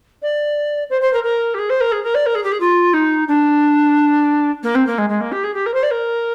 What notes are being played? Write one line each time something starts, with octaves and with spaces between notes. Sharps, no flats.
D5
C5
C5
A#4
A#4
G4
G#4
C5
A#4
G#4
A#4
D5
A#4
G#4
G4
G#4
F4
D#4
D4
A#3
C4
A#3
G#3
G#3
A#3
G4
G#4
G4
A#4
C5
D5
A#4